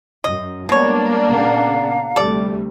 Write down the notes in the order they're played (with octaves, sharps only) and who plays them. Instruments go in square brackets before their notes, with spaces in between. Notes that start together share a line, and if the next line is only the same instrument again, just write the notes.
[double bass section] F#2 [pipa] D#5
[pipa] B2 C#5 [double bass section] G3 G#3 B3 [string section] A#3 D4
[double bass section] A#2 C#3 B3 [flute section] F5 F#5 A#5
[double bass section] D2 C3 A3 [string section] G3 [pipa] A4 D5